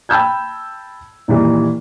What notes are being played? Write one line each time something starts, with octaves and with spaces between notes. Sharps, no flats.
G5 A5 B5 E6 G6 G#6
A#2 D#3 E3 G3